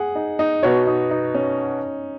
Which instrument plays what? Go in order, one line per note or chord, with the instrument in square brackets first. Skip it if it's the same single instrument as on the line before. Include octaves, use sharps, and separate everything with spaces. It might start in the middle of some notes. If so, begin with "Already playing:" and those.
Already playing: [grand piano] G#4 F#5
D#4
D#4
[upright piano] B2 B3 F#4 C#5 [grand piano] D#4
[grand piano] D#4
D#4
C#4